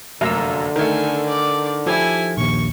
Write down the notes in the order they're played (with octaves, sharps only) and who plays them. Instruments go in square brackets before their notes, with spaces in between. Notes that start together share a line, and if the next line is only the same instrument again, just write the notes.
[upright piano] F1 F#2 A#3 [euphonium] D3 [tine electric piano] F5 A#5 E6
[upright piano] D#3 A3 [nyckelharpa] A4 G#5 [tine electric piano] A#4
[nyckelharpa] D5
[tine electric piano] F3 G4 A4 [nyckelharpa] E4 G#5
[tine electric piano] A#1 D#2 [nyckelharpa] C#6